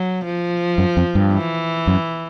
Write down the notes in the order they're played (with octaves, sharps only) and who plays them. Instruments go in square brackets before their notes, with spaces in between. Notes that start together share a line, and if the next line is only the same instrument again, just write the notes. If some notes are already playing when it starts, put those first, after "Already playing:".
Already playing: [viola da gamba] F#3
F3
[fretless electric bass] F#2
F2
G2
[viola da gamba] E3
[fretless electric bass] F#2